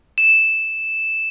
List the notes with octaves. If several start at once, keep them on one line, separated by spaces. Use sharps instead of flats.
E7